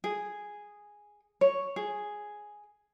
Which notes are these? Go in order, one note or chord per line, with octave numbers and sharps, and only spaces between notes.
G#4
C#5
G#4